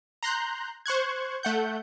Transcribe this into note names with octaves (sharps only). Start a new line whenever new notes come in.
A#5 C6 F#6 G6
C5 C#6 F#6 G#6
A3 F#5 G6